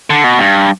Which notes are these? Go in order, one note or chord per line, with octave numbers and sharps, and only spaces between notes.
D3
B2
G2